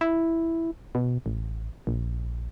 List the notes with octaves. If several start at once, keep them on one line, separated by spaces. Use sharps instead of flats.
E4
B2
A1
A#1